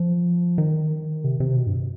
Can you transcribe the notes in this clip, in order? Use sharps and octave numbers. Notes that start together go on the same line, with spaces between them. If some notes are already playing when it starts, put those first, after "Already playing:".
Already playing: F3
D#3
C3
C3
B2
G2